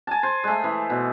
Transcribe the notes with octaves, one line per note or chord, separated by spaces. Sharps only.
G#5 A5
C5
G#3 A3
E3
B2